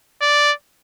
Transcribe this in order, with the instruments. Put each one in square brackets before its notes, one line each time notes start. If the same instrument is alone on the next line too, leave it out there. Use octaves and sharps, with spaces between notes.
[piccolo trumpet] D5